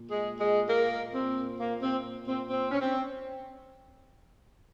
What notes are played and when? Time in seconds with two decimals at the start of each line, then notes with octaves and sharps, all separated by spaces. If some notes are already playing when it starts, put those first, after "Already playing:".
Already playing: A#2
0.09 G#3 G#4
0.40 G#3 G#4
0.69 A#3 A#4
1.14 C4
1.60 A#3
1.82 C4
2.28 C4
2.50 C4
2.71 C#4
2.80 C4